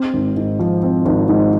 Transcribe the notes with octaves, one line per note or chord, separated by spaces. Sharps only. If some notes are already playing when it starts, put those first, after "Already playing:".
Already playing: C4
G#1
G#2
F3
C4
G#1
G#2